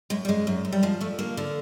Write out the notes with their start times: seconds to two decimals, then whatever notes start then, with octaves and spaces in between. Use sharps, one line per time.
0.10 F#2 G#3
0.25 G3
0.28 F#2 G#3
0.47 F#2
0.65 F#2
0.73 G3
0.83 F3 G#3
1.01 F3 A3
1.19 D3 A#3
1.37 D3